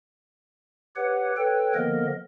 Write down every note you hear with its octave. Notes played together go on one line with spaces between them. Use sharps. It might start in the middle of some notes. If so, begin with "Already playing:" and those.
G4 B4 C#5 F#5
A4 B4 C#5 G5
D3 F3 A#3 B3 A#4 D#5